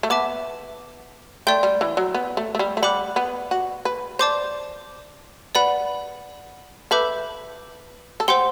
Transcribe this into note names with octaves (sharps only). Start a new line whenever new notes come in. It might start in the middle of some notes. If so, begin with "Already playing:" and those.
A3
B3 E5 A5 D6
A3 D5 G5 C6 G6
G3
E3
F#3
B3
A3
A3
G3
A3
G3 F#5 B5 D6 F#6
B3
F#4
B4
C5 D5 A5 D6 G6
B4 D5 F#5 B5
A4 B4 E5 B5 D6 G6
A4
G4 C5 F#5 C6